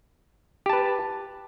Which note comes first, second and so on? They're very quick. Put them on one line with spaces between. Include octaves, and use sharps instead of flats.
G4 A5 B4